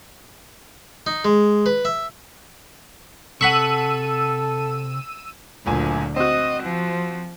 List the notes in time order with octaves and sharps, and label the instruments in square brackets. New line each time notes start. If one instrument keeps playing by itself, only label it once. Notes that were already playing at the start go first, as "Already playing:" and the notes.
[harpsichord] D#4
G#3
B4
E5
[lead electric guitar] C3 [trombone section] A4 [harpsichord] F#5 B5 C#6 [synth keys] E6 D#7
[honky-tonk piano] F#1 A#2 G#5 [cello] D2
[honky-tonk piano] C4 F#4 [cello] D#5
[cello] F3